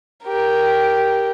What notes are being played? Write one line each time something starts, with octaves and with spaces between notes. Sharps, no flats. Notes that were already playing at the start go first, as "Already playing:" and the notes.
G4 A#4